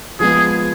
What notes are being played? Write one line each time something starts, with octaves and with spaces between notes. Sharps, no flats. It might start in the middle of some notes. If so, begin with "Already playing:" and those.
F3 G#3 B3 G#4